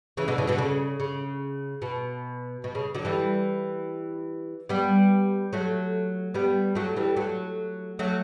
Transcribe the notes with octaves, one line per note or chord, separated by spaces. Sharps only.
C#3 E3
B2 D3
C#3 E3
B2 D3
C#3
C#3
B2
B2
C#3
D3 F#3
E3 G3
G3 B3
F#3 A3
G3 B3
F#3 A3
E3 G3
F#3 A3
F#3 A3